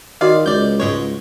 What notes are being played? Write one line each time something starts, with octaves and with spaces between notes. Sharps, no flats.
D#3 F#4 D5 D#5 F5
C#2 D5 G6
G#2 G#3 C#5